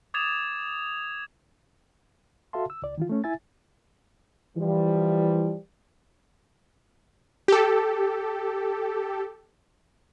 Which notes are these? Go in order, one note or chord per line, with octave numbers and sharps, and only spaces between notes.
D6 D#6 G#6 A6 E7 F7
F#4 A4 E5 F5 A5 C6
E6
C#2 D5
D#3 E3 F4
A3 C#4
E4 E5 G#5 A6
E3 F3 G3
G4 A4